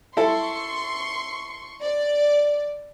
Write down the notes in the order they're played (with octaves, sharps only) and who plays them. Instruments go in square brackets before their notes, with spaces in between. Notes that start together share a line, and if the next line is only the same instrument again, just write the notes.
[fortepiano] E4 A4 [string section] C6 C#6
[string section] D5